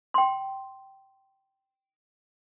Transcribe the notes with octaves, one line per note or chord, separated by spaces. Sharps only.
G5 C6